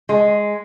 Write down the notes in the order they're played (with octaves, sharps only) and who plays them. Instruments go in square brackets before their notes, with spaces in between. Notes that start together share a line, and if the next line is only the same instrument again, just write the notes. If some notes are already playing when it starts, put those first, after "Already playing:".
[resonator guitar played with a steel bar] G#3